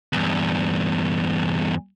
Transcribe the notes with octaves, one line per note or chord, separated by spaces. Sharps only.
E2 G2